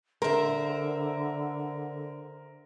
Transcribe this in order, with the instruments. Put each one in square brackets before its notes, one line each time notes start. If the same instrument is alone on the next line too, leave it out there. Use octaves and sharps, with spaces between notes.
[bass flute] D3 [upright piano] A#4 [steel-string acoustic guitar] C5 E5